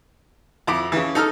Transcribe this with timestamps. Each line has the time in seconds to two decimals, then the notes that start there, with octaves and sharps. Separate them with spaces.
0.67 F2 E4 D6
0.92 C#3 E3
1.15 D#4 A4 D#6 F6